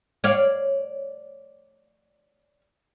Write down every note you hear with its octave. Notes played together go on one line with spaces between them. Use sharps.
C#5 D5 F5